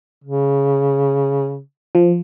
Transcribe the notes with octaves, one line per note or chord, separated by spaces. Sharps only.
C#3
F3